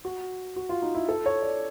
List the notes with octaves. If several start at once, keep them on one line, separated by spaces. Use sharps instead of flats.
F#4
F#4
F4
D#4
E4
A4
C#5
D5